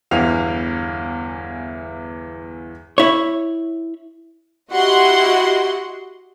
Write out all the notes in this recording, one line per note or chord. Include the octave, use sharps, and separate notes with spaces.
G1 E2 E3 F5 F7
E4 C#5
E4 F#4 G4 D#5 F#5 C6